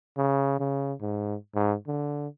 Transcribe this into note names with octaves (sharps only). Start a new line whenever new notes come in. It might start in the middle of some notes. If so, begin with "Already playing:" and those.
C#3
C#3
G#2
G#2
D3